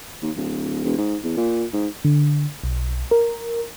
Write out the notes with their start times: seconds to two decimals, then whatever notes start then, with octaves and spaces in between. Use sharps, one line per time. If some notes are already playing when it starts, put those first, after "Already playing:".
0.22 D#2
0.36 D1
0.84 E1
0.98 G#2
1.24 E2
1.37 A#2
1.73 G#2
2.05 D3
2.64 B1
3.11 A#4